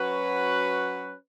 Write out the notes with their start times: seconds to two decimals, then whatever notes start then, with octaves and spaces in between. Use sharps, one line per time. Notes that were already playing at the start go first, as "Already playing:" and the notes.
Already playing: F#3 C#4 F#4 B4